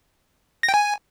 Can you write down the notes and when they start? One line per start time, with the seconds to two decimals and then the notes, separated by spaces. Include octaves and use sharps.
0.63 A#6
0.69 G5
0.74 G#5